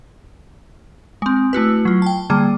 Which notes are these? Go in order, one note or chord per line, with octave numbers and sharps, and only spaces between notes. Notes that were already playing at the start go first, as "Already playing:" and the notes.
G#3 C4
A3 E4 F#4 B4
F#3 F4
G5 A5
D3 G3 A#3 G#4